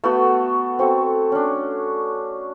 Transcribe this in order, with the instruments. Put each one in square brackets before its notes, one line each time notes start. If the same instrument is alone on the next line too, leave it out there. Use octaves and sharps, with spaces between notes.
[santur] A3 B3 F#4
C4 F#4 A4
C#4 D4